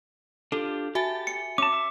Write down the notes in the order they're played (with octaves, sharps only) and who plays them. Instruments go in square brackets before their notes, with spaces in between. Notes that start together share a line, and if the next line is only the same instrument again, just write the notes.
[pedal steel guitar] D4 F4 G4 [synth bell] A4
[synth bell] F#4 E5 G#5 [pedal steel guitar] G4 A5
[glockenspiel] C#7
[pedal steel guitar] C#4 A5 [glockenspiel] D6
[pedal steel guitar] E5